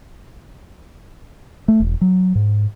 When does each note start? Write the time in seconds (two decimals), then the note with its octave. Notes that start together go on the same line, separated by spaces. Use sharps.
1.68 A3
1.80 E1
2.01 F#3
2.35 G#2